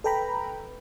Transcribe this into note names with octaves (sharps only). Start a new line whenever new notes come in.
A4 B4 G5 A#5 B5